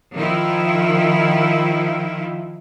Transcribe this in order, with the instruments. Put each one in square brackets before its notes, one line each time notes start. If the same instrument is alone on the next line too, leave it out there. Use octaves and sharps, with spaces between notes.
[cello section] D#3 F3 E4 F4